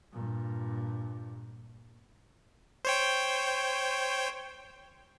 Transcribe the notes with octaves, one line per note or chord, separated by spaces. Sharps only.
G2 A#2
C5 C#5 G5